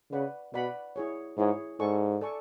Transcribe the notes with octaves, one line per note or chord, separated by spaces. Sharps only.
C#3 B4 D5 F#5 B5
B2 B4 D5 F#5 B5
E4 G#4 C#5
G#2 E4 G#4 C#5
G#2 A4 D5 G#5 C#6
A4 D5 G#5 C#6